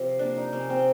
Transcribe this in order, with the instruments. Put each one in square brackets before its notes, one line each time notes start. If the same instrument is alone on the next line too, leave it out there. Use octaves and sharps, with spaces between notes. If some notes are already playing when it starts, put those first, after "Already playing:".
Already playing: [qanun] C3 F3
A#3 D4
D#4
C3 C#4
C4